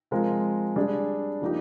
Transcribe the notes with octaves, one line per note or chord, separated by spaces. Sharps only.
F3 G#3 C4 F4 A#4
G3 D4 G#4
F3 A#3 D#4 G4